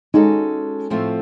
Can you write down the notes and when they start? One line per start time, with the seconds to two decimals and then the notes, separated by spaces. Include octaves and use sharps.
0.14 G#3 C#4 D#4 F#4 A4
0.90 A2 F3 A3 C4 F4